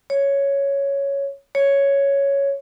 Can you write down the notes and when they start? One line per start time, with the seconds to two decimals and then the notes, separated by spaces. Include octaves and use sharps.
0.10 C#5
1.55 C#5